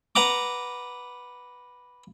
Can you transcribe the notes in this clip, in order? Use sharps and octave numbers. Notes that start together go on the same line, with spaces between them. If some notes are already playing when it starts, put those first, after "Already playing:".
B4 F#5 A#5 D6